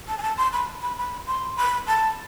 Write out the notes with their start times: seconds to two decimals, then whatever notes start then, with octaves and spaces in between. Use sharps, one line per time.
0.08 A5
0.18 G#5
0.23 A5
0.37 C6
0.53 B5
0.82 B5
0.97 B5
1.27 C6
1.57 B5
1.87 A5